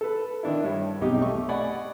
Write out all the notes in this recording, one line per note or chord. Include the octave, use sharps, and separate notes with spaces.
A4 B4
D#3 D4 E4
G2 C#5
B1 E2 C3 D#4 G4 D6
A3 C#6
D5 D#5 F#5 G#5 B5